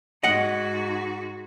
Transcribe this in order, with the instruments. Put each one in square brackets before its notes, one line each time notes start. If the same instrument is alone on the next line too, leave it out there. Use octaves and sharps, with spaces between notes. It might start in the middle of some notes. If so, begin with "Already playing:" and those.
[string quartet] G#2 F#4 [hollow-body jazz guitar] D#5 F#5